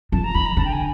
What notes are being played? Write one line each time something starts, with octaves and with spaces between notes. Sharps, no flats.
F3 A5
A#5
D#3 B5
A#5
D3 A5
G5
G#5